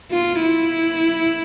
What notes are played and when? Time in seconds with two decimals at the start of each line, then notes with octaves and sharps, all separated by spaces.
0.11 F4
0.41 E4